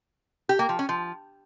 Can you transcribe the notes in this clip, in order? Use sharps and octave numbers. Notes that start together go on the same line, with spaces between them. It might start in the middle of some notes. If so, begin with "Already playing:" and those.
G4
A#3
F3
C#4
F3